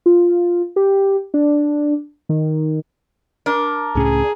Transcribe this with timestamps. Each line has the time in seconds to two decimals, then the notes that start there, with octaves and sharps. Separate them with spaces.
0.06 F4
0.76 G4
1.34 D4
2.29 D#3
3.46 D4 A#4
3.95 C#2 A2 C#4 G#4